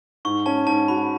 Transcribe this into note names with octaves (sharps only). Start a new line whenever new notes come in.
G#2 C#6
C#4 A5
G#2 A5
F#4 B5